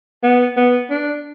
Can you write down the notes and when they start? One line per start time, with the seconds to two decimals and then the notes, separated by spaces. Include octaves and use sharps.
0.23 B3
0.57 B3
0.90 D4